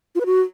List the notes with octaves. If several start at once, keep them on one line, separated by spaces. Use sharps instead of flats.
F4
B4
F#4